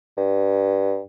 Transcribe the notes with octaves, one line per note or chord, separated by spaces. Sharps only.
G2